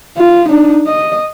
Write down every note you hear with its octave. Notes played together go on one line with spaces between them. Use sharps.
F4
D4 D#4
D#5